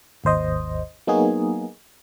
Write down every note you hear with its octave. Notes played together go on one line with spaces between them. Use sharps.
G#1 D#2 C5 D#5
F#3 A#3 B3 D#4 F#4 G#4